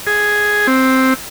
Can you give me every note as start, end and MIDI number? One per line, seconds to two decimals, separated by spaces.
0.07 0.67 68
0.67 1.14 60